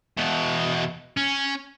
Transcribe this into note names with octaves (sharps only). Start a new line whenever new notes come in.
E2 B2
C#4